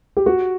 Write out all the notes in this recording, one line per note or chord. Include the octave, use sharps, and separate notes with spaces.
G4
F#4